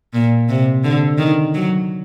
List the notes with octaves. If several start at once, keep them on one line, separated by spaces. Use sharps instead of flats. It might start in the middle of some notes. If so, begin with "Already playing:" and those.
A#2
C3
D3
D#3
F#3